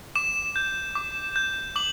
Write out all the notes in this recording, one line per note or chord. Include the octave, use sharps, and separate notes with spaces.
D6 E7
G6
D6
G6
D6 F#7